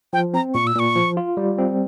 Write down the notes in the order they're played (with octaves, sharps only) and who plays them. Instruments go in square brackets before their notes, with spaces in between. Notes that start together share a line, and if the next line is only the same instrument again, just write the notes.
[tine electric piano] F3 [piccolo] G5
[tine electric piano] C4 [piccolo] A#5
[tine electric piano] A#2 [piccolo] C#6
[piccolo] E6
[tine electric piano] A#2 [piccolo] C#6
[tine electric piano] F3
F4
G3
C4